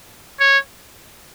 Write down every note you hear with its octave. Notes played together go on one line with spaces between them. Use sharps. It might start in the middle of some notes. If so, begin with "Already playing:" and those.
C#5